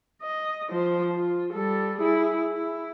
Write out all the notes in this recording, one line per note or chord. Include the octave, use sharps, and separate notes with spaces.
D#5
F3 C5
F4
G3 A4
E4 G#4
E4